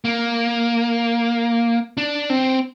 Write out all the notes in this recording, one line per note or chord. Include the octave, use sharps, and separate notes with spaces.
A#3
D4
C4